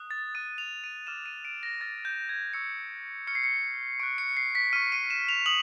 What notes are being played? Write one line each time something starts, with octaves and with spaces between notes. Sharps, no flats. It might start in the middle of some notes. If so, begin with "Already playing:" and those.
Already playing: D#6 F#6
A6
D#6 F#6 D#7
F7
D#7
D6 F6 E7
D#7
D7
A#6
D6 F6 A6
G6
G#6
C#6 E6 G6 C#7
C#6 F6 C#7
C7
C#7
C#6 F#6 D7
C#7
C7
B6
C#6 F6 D#7
D#7
E7
F7
D#6 F#7